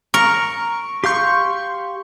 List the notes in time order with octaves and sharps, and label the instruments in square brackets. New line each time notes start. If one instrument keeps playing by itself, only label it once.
[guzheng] A#4 [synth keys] C#6
[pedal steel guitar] G4 F5 G6 [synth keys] C6 C#6